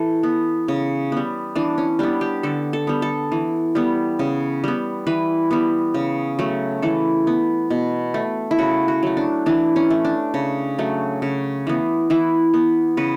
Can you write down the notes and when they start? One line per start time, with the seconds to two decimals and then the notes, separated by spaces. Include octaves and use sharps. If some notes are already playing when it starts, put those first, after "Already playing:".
Already playing: E3 A4
0.23 B3
0.68 C#3
1.12 G3 B3
1.56 E3 D4
1.78 C#4
1.99 G3 B3 D4
2.21 G4
2.43 D3 A4
2.73 A4
2.87 G3 B3
3.02 A4
3.32 E3
3.75 G3 B3
4.19 C#3
4.64 G3 B3
5.07 E3 B4
5.51 G3 B3
5.94 C#3
6.39 F#3 A3
6.82 E3 A4
7.27 B3
7.70 B2
8.14 A3
8.51 E4
8.59 C#3 F#4
8.88 F#4
9.03 F#3 A3
9.17 D4
9.46 E3 D4
9.76 C#4
9.90 A3
10.05 D4
10.34 C#3
10.79 F#3 A3
11.22 C#3
11.67 E3 B3
12.10 E3 E4
12.54 B3
12.97 C#3 B4